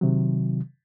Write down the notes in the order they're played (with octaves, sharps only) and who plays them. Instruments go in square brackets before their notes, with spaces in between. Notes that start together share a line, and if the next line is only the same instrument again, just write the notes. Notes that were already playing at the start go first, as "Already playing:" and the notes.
[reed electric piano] C3 D#3 F#3